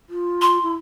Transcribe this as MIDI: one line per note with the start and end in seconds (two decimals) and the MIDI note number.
0.09 0.58 65
0.42 0.73 84
0.63 0.73 64